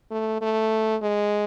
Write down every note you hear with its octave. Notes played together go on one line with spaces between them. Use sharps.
A3
A3
G#3